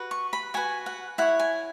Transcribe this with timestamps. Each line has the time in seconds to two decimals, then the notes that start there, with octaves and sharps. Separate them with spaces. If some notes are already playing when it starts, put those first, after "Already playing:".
Already playing: F#4 B4
0.11 C#6
0.33 B5
0.54 F#4 B4 G#5
0.86 F#5
1.18 E4 C#5 F#5
1.39 G#5